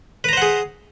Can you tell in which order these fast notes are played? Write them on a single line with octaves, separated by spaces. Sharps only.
B4 A#5 C5 F#5 G#4